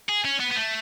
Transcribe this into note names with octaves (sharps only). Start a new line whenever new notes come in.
G#4
C#4
B3
B3
A3